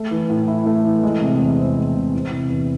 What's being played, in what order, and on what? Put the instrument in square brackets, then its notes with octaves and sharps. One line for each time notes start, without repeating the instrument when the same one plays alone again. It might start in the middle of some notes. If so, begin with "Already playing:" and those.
Already playing: [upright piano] A3
E3
A2
E4
A3
E3
G#3
C3
E2
C4
G#3
C3
E3
C3
E2